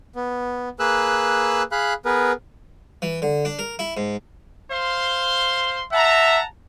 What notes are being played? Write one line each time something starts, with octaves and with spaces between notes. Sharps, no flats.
B3
A#3 G#4 B4 E6 F#6
G#4 F5 B5 F#6
B3 G#4 A#4 B4
E3
D3
D4
A#4
E4
G#2
C5 F5 C6
E5 F#5 A5 A#5